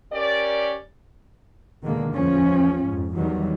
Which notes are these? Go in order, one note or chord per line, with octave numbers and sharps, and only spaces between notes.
C#4 G4 A#4 D5
E2 B2 D3 D#3 G#3 A#3
A1 E2 F3 C#4
F2 G#2
E2 D#3 E3 F#3 G3